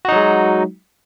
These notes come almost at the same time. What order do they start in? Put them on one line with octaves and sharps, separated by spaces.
F#4 D#4 F#3 G#3